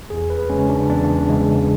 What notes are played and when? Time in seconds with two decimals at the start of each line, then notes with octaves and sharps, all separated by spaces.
0.10 E2 G#4
0.30 B4
0.50 C#3 G#3 C#4
0.70 D4
0.90 E2 D4
1.29 C#3 G#3